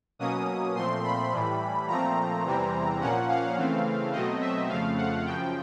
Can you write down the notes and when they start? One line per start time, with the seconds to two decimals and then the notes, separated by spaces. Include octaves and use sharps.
0.19 B2 F#3 A#3 C#4 D#6
0.75 A#2 F3 A3 C4 C6
1.03 B5
1.32 A2 E3 G3
1.88 A#2 F3 A3 C4 A#5
2.44 E2 C3 E3 G3 C4
3.00 A#2 F3 A#3 C#4 F#5
3.28 F5
3.57 C#3 E3 A3 C4
4.12 B2 F#3 A3 C4 D#5
4.41 E5
4.69 F2 C#3 F3 A3 F5
4.97 F#5
5.25 F#2 C#3 F3 G5